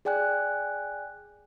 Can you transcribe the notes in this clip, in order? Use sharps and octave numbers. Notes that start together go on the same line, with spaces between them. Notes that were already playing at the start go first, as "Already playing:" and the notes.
G#4 D5 G5 G#5 F#6